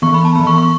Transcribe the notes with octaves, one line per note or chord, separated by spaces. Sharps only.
E3 B3 C#6
B5
A5
E3 B3 B5
C#6
C#6